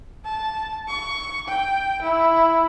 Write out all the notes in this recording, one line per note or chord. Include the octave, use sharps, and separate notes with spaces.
A5
C#6
G5
E4